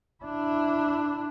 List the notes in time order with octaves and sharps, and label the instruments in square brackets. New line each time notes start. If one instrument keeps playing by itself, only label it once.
[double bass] D4 E4